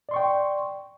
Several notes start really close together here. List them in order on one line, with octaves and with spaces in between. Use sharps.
D5 C6 C#6 G5